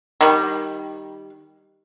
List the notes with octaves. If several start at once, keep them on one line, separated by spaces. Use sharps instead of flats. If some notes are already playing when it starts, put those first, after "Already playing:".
D#3 G3